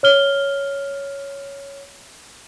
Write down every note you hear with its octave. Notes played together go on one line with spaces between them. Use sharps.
C#5 F6 G7